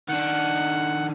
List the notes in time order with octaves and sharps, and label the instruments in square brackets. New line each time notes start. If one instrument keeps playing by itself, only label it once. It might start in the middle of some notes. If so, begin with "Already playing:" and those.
[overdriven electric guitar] D#3 D4 [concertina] F#5